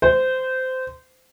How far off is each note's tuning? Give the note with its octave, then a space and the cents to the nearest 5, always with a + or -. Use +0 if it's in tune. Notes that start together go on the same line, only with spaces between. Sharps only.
C5 -20